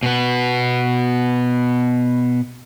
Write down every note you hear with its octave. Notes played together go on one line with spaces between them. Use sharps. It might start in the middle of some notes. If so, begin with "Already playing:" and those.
B2 B3